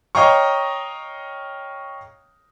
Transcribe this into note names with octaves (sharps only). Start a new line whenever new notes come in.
C#5 D#5 F5 G5 A#5 C#6